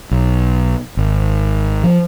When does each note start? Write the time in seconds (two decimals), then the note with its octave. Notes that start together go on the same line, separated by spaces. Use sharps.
0.11 B1
0.97 G#1
1.83 F3